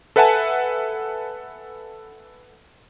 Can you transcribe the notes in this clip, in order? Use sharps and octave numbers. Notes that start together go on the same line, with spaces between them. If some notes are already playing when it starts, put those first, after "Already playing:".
A4 B4 E5 F#5 G#5 A5